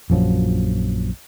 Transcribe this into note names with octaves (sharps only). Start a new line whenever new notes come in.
A#1 F#2 F3 F#3